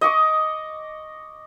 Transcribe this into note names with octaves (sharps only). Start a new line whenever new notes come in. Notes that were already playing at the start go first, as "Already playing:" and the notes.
D#5 C#6 D6